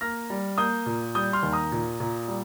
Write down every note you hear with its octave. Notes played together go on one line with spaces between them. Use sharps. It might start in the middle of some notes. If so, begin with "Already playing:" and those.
A#3 F6 A#6
G3
A#3 D#6 G6
A#2
G3 D#6 G6
C6 F6
D#2
A#5 D#6
A#2
A#2
G3